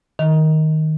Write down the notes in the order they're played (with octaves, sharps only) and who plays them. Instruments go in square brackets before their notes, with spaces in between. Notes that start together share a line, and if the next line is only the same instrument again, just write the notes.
[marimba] D#3